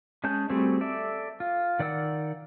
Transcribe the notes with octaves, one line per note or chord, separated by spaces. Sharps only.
G#3 C#4 G#4 A5 G6
G3 A3 C4 F#4 G#4
A4 D5 E5
F4
D#3 D5 F#5 E6